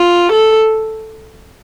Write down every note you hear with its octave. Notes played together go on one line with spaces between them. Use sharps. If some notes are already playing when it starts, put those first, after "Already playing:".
Already playing: F4
A4